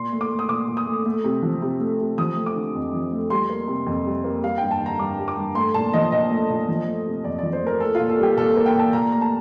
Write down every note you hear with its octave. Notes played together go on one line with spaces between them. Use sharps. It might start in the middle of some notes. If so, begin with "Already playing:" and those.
Already playing: A#2 C6
A3
D6
A3
D#6
A#2 D6
A#2
D#6
A3
A3
C3
F3
C3
A3
C3
F3 D#6
A3
D6
D3
F2
F3
A3
G3 C6
A#3
C3
F2
G3
A#3
G3 F5
G2 G5
A5
D3
A#5
G2 D6
G3
D6
G2
A3 C6
A#2 A5
F3 D#5
A#2 D#5
A3
A#2
F3
A3
C3
F2 D5
F3 D5
C5
A3 A#4
A#3 A4
F4
A#2
A4
G3 G4
A#2 A4
A#3
G5
A#2 A5
A#2 A#5
A3 A#5
A5